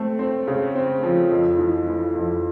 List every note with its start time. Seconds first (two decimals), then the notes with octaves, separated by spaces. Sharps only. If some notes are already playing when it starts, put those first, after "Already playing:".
Already playing: A3 C4
0.19 C4
0.47 C#3
0.75 C4
1.03 F3
1.31 F2
1.58 E3
1.87 E3
2.15 F2